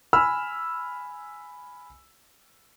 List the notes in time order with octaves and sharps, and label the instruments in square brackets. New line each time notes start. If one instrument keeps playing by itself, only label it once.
[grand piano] G#5 B5 E6 F6